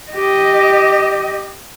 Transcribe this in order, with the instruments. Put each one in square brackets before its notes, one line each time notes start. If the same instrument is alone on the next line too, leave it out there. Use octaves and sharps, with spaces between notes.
[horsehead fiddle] G4 D#5